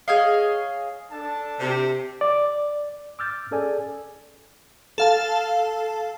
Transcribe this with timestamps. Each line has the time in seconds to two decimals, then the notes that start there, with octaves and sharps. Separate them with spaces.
0.08 G#4 C#5 D#5 F5
1.11 D4 A4 A5
1.60 C3
2.21 D5
3.19 D6 E6 F6 G6 A6
3.51 C#4 G#4 A4 D5 G#5
4.98 A4 F5 A5